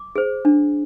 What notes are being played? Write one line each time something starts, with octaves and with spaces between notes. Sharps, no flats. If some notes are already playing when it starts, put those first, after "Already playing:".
Already playing: D6
G#4 C5
D4